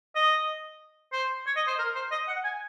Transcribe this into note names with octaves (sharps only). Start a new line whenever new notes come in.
D#5
C5
C#5
D#5
C5
A#4
C5
D#5
F#5
G#5